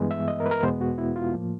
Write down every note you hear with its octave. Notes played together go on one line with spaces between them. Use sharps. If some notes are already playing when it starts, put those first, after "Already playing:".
Already playing: G2 E3 G#3 B3
E5
D#5
A#4
B4
A#4
E2 B2 G#3 B3 C5
F#4
E4
F4
A2 F3 A#3